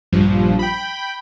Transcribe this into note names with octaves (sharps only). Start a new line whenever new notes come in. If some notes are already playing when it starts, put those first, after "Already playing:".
A#1 G2 F3
G5 B5